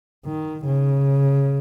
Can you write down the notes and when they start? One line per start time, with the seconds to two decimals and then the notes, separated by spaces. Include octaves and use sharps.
0.25 D#3
0.66 C#3